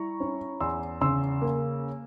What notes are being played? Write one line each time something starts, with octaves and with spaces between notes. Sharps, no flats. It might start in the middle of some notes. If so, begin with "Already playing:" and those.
Already playing: G3 E4 A#5 C#6
C#4
E2 C6 E6
C#3 C6 E6
A#3